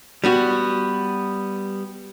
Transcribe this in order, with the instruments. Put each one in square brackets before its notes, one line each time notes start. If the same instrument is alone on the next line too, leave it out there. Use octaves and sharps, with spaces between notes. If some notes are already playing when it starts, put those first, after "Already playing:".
[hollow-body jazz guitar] G3 B3 F#4